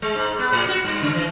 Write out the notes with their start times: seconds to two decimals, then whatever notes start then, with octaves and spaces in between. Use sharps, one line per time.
0.02 G#3
0.15 G#2
0.39 B3
0.52 A2
0.68 F#4
0.84 G2
1.02 C#3
1.14 E3